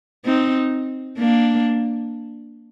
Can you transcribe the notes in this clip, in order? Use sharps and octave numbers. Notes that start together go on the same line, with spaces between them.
C4 D#4
A#3 D4